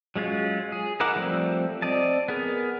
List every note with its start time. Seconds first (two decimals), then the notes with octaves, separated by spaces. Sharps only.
0.16 F#3 G#3 C#4 F4
0.72 G#4
1.00 D#4 E4 A#4 F#5 D6
1.16 F3 G3 A3 C4
1.82 C4 D5 D#5 A5
2.28 B3 G#4 A#4